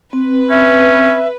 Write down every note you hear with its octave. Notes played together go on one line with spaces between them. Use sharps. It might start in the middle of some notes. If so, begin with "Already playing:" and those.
C4 B4
C#4 E5